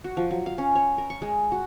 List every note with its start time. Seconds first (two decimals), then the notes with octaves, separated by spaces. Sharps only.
0.04 F#4
0.17 F3
0.31 F#3
0.46 F5
0.58 C#4
0.75 C#5
0.98 A#4
1.10 C#6
1.22 G#3
1.52 F#4